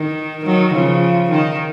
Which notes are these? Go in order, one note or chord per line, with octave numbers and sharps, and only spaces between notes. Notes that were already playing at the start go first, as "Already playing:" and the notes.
Already playing: D#3
D#3 F#3
C#3 F3
D#3